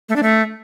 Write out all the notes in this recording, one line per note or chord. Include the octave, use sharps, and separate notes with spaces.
A3
D4
A3